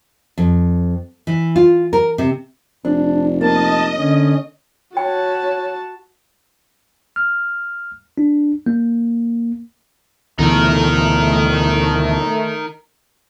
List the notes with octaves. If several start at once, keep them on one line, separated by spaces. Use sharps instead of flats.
F2
E3
F4
A#4
C3
F1 D4
A#3 D#5 A5
D3 C#4
F#4 C#5 G5 A5
F6
D4
A#3
D2 B2 E3 A3 D#4 A#4